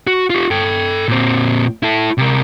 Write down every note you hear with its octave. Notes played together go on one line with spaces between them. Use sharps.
F#4
F4 G4
A4 G5
A#2 C4
E4 A4
C3 A#4